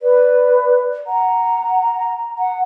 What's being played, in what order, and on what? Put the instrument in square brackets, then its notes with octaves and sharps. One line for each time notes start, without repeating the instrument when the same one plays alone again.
[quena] B4 [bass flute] D5
[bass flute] F#5 [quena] A#5
[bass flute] F#5